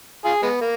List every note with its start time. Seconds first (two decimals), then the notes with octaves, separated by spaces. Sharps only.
0.25 F4 G#4
0.43 G#3 B3
0.61 A#3